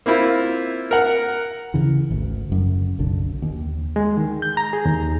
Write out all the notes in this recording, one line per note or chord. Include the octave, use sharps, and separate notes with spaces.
A#3 C4 E4 F4
A#4 F#5
C#3 E3
G#1 D2
F#1 F#2
F#1 B1 D3
D#2
G#3
D#3
G6
A#5
G#4
D#2